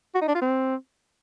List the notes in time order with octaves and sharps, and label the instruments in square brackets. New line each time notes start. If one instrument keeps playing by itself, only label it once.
[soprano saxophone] F#4
D#4
D4
F4
C4